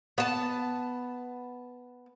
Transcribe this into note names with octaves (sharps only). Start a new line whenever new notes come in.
B3 A5